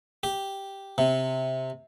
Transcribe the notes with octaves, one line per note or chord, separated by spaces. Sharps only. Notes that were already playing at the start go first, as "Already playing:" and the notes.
G4
C3